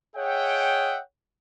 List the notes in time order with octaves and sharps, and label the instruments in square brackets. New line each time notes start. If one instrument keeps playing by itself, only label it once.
[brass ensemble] G#4 C#5 D#5 E5 F#5 G5